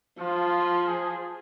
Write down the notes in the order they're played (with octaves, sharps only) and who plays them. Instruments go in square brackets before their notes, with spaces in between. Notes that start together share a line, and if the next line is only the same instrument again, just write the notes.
[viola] F3 [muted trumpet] F4
[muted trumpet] G#4